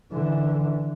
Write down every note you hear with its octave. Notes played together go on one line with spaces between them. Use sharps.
D3 E3